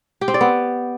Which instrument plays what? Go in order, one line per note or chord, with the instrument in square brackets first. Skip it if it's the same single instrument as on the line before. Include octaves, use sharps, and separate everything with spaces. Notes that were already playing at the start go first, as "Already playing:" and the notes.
[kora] G4
C4
D5
B3